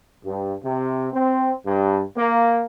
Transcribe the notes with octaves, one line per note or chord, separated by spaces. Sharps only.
G2
C3
C4
G2
A#3